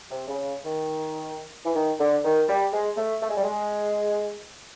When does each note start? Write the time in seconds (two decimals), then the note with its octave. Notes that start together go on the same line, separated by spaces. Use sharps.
0.11 C3
0.28 C#3
0.65 D#3
1.65 E3
1.75 D#3
2.00 D3
2.25 D#3
2.49 G3
2.72 G#3
2.97 A3
3.22 A3
3.30 G#3
3.37 G3
3.44 G#3